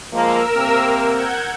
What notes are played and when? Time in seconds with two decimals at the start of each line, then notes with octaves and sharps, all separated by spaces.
0.14 F3 G#3 A#3 A#4 E6
0.55 C3 A#3 C4
1.06 F#5 G6 G#6